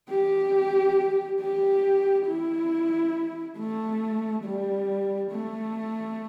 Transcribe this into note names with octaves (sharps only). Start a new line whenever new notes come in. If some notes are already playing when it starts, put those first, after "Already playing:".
G4
G4
E4
A3
G3
A3